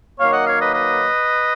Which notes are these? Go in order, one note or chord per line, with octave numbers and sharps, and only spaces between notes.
D#3 F#3 A#3 C#5 F5
D#5 F#5
C#5 F5
B4 D#5
B4 D#5